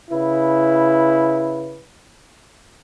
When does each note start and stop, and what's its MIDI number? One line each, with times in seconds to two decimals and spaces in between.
0.11 1.82 49
0.11 1.82 64
0.11 1.82 71